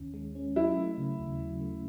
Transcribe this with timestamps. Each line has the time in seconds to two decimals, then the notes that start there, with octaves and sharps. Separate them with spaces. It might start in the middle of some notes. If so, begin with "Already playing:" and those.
Already playing: D#2 D#3 C#4
0.14 G#3
0.35 C#4
0.56 F#3 E4
0.77 A3
0.98 C#3
1.19 D#2
1.40 F#3
1.61 A3